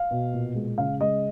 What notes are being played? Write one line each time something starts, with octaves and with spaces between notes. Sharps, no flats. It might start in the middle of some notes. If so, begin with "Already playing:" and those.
Already playing: F5
B2
A#2
G#3
C#3 F5
G#3 D#5